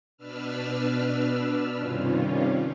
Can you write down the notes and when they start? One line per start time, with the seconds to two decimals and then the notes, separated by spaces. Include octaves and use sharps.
0.17 B2 D4 B4 E6 F6
1.78 G2 C3 D#3 G3 C#4 F4